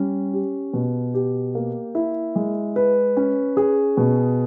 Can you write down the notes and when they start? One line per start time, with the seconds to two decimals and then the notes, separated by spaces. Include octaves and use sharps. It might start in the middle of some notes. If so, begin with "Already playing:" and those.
Already playing: G3 C#4
0.34 G4
0.73 B2
1.14 G4
1.55 A#3
1.95 E4
2.36 G#3
2.76 B4
3.17 C#4
3.57 G#4
3.97 B2